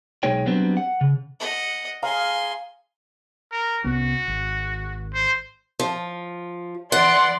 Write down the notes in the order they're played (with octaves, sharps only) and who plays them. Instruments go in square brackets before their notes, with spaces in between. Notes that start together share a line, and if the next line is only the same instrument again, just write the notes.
[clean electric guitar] B1 G#3 D#4 G#4 C#5 G5
F#3 G3 B3 C4 D4
F#5
C#3
[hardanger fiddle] D#5 F#5
[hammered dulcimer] G#4 F5 A#5 [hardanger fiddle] G#5 C6
[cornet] A#4
[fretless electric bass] C2 B3 C#4 [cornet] F#4
[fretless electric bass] G#1
[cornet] C5
[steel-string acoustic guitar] F3
[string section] E3 D5 [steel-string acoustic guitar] F#5 [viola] C6